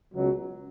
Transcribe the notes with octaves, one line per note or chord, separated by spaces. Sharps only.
C#2 B2 F#3